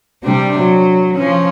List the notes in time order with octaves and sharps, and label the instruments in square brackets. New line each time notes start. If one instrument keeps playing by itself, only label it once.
[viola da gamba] C3 G3 D4
F#3
F3 C#4